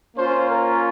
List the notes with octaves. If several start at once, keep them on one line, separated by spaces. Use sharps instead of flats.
A#3 C#4 F4 C5
A#4